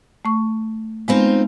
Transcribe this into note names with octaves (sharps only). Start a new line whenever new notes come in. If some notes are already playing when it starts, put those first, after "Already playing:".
A3 C#6
G#3 B3 C4 D#4 F4